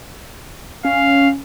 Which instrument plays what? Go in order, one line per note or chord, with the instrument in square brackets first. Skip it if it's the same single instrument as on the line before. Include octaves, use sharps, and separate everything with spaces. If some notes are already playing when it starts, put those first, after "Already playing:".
[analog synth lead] C#4 [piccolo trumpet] F5